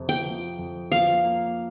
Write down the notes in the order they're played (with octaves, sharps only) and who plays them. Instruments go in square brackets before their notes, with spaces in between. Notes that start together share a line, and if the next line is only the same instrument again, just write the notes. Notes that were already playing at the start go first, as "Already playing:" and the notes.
Already playing: [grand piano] F2 C3
[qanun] G5
[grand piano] F3
F2
[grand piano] F3 [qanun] F5
[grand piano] A#3